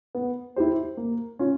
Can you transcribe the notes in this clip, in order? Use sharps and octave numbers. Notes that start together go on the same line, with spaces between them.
B3
E4 G4 C5
A#3
C#4 F4